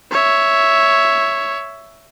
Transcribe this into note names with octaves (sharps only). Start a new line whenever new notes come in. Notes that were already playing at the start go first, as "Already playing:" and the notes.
C#5 E5